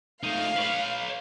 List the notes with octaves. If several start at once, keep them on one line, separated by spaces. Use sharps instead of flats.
A3 D#4 F5
B4 C#5